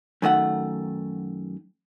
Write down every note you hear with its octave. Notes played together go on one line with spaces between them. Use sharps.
F#2 D#3 A3 F#5